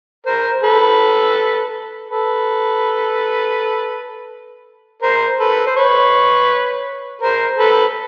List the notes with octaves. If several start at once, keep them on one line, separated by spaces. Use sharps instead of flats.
A#4 C5
A4 B4
A4 B4
A#4 C5
A4 B4
C5
B4 C#5
A#4 C5
A4 B4